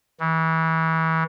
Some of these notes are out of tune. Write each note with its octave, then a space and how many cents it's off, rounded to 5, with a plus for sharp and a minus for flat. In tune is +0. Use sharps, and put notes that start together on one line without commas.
E3 -30